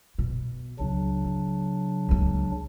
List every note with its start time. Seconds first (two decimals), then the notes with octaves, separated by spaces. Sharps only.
0.18 B2
0.79 C#2 C#3 F#3 D4
1.24 E4
2.09 C#2 A#3